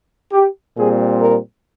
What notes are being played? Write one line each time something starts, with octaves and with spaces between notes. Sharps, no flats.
G4
A#2 G3 C4 G#4
A#4